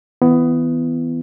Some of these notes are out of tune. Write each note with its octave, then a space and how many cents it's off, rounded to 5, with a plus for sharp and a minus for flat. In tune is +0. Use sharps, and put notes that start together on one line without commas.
E3 -35 B3 +15 E4 +30